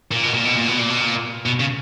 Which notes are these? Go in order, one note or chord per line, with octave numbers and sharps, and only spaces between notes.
A#2
B2
A#2
B2
A#2
B2
A#2
B2
A#2
B2
C#3